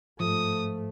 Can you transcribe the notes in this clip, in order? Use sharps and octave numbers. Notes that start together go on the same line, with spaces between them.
G#2 F3 A3 D#6